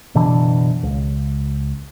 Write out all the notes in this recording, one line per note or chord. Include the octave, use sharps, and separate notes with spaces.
F#1 B2 E3 D4
C#2